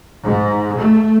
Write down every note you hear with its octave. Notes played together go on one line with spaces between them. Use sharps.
G#2
A3